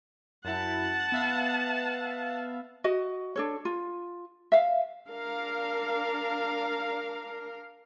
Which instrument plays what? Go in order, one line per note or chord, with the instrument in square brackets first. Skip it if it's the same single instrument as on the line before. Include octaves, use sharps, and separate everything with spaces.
[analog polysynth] F#2 E4 [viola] F#5 A5
[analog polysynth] B3 E5 F5
[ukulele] F#4 D#5
D4 A4 C#5
F4
E5 F5
[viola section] D4 A#4 F5